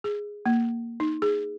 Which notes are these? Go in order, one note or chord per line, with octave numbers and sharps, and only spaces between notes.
G#4
A#3
D#4
G#4